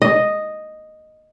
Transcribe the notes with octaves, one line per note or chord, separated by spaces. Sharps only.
D#5